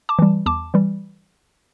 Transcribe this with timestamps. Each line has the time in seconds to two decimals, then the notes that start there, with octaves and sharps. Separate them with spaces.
0.09 A5 D6
0.19 E3 G3
0.46 E2 A5 D6
0.74 E3 G3